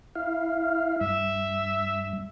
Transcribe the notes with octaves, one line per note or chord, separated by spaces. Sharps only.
E4 F5
G2 E5